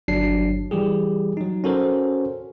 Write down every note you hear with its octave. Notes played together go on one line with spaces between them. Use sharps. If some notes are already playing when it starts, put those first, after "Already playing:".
G1 F#3 D4 C7
E3 G3 G4 G#4
F#3 D#4
C#4 F#4 A4 A#4 C5